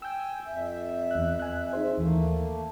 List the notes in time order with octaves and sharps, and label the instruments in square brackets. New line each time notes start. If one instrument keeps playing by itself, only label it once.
[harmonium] G5 G#5 [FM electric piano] E6 G6
[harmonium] F2 E5
[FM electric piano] E2 F#6
G#5 F#6
D#4 G#4 C5
[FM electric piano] D#2 E3 [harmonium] A3 A#3